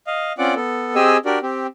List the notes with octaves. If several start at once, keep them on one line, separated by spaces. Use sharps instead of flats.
D#5 F5
C4 C#4 F4 D5 F#5 D6
B3 A4
C4 G4 G#4 D#5 G#5 E6
D4 F#4 G4 A#4 D5
C4 G4